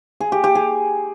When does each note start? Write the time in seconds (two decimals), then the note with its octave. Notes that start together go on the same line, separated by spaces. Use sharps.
0.20 G#4
0.32 G4
0.44 G4
0.55 G#4